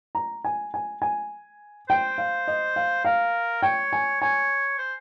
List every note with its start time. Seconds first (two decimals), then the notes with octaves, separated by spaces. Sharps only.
0.15 A#5
0.45 G#5
0.74 G#5
1.02 G#5
1.89 C5 G5
2.18 F5
2.48 D#5
2.76 F5
3.05 A#4 F5
3.63 C#5 G5
3.93 G#5
4.21 C#5 G#5
4.79 C5